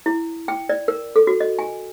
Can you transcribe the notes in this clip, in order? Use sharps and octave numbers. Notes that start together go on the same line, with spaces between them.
E4
G5
D5
A#4
A4
F#4
D#5
G#5